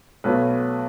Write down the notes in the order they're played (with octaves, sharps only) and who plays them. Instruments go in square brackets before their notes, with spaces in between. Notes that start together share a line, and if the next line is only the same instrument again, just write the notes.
[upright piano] B1 B2 F#3 A3 B4